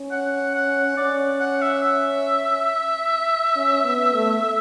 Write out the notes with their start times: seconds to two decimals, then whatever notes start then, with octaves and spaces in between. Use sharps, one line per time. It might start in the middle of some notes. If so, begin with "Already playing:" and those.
Already playing: C#4
0.11 F#5
0.55 F#5
0.97 C#4 D5
1.40 F#5
1.62 E5
1.83 E5
3.55 C#4
3.84 B3
4.13 A3